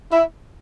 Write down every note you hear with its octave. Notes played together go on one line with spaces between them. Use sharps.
E4